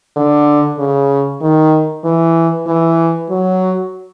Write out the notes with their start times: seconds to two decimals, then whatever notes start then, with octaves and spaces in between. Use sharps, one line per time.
0.17 D3
0.79 C#3
1.42 D#3
2.05 E3
2.67 E3
3.30 F#3